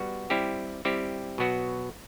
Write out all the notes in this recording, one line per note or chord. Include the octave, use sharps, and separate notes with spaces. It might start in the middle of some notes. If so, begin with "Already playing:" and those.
Already playing: G3 B3 F#4
G3 C4 E4 G4
G3 C4 E4 G4
B2 F#3 B3 F#4